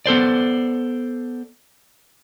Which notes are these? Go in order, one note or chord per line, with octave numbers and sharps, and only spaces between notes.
B3 A4 C5 D5